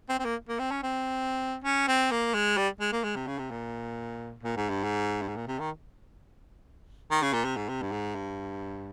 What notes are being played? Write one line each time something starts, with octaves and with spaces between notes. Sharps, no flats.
C4
C4
A#3
A#3
C4
C#4
C4
C#4
C4
A#3
G#3
G3
G#3
A#3
G#3
C3
C#3
C3
A#2
A#2
G#2
G2
G#2
G2
G#2
A#2
C3
D#3
D#3
C#3
A#2
C3
G#2
C3
G2
G#2
G2